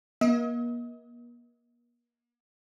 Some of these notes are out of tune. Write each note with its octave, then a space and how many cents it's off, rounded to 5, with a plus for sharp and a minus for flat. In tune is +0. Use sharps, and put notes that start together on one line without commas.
A#3 +40 D#5 +35